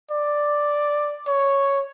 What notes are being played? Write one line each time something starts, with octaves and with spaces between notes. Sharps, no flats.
D5
C#5